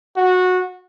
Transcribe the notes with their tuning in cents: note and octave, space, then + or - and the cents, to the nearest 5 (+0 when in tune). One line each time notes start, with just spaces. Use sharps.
F#4 -15